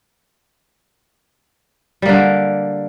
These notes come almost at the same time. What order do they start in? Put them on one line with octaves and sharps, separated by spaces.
G3 A#3 D3